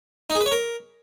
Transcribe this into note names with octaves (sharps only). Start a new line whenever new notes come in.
D#4
G#4
B4
C#5
A#4